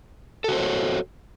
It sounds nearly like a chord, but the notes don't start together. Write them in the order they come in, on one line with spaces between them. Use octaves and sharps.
A4 F#4 C5 C#5